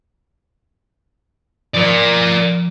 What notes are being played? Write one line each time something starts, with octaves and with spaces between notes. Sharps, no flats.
F3 A#4 D5